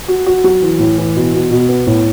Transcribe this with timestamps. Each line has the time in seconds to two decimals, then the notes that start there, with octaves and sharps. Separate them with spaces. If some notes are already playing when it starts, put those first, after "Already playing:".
0.08 F#4
0.26 F#4
0.44 F#3
0.62 E3
0.79 A2
0.98 E3
1.16 B2
1.34 B2
1.51 B2
1.69 B3
1.87 A2